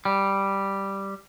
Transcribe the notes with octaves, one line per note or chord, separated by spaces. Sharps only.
G3